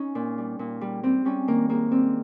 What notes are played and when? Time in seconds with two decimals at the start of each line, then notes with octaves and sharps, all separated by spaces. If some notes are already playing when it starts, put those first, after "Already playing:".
Already playing: C#4 D#4
0.15 A#2
0.38 G3
0.59 A#2
0.81 G3
1.04 G3 C4
1.25 G3 C#4
1.47 D#3 A#3
1.69 G#2 A#3
1.91 G3 C4